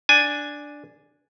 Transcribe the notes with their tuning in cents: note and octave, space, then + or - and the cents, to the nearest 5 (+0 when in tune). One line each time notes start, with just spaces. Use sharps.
D4 +0 G#5 +0